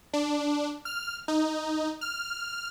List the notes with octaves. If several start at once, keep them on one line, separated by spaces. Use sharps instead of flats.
D4
F6
D#4
F6